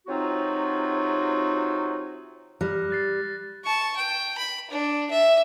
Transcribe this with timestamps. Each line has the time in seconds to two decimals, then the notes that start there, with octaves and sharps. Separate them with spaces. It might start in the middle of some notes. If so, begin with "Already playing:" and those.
0.07 C3 F#3 C4 D#4 F4 F#4
2.61 G3 F6 F#6 A#6
2.90 F#6 A6 C7
3.64 A5 C#6
3.97 G5
4.38 B5
4.71 D4
5.11 E5